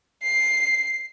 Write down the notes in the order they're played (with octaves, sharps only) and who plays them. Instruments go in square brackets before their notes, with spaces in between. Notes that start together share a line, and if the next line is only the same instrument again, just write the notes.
[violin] C7